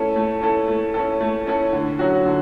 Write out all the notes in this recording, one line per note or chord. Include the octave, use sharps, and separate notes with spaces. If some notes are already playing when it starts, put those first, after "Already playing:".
Already playing: A3 C#4 E4 A4
A3
C#4 E4 A4
A3
C#4 E4 A4
A3
C#4 E4 A4
D3
F#3 C#4 F#4
D3